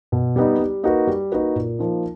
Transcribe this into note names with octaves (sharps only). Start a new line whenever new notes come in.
B2
G3 B3 D#4
G3
A#3 D#4 F#4 B4
G3
A#3 D#4 F#4 B4
A#2
F3 A#3 D#4